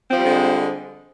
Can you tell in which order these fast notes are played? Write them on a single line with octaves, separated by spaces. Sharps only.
C4 F3 G3 D3 G#3